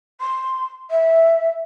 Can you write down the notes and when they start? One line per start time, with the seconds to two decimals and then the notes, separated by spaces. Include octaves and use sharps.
0.20 C6
0.90 E5